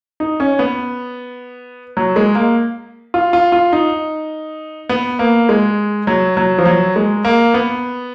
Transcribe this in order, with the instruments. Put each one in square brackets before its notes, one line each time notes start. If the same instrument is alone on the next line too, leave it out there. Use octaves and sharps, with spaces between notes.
[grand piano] D#4
C#4
B3
F#3
G#3
A#3
F4
F4
F4
D#4
B3
A#3
G#3
F#3
F#3
F3
F#3
G#3
A#3
B3